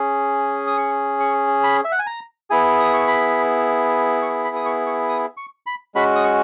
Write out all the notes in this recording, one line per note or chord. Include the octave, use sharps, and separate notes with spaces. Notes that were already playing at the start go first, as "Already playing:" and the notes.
Already playing: C#4 G#4
D#6
C#6
C#6
B5
E5
F#5
G#5
A#5
B3 E4 G#4 G#5
D#6
C#6
B5
C#6
B5
D#6
C#6
C#6
D#6
C#6
B5
G#3 C#4 F#4 B5
D#6
C#6